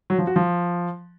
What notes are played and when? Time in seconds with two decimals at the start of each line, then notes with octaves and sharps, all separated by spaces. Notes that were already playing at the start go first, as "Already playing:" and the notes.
0.10 F#3
0.18 F3
0.27 F#4
0.36 F3